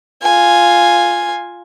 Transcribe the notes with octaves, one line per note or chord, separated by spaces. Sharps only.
F4 G#5